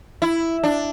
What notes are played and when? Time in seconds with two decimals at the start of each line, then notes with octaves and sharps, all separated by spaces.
0.22 E4
0.64 D4